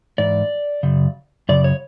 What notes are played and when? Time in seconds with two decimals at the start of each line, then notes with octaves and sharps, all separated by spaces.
0.18 G#2 E3 D5
0.83 F#2 C#3
1.49 F#2 C#3 D5
1.64 C#5